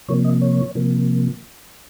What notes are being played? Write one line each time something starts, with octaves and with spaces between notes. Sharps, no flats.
C3 F3 A#3 C#5
D#5
C#5
C3 F3 A#3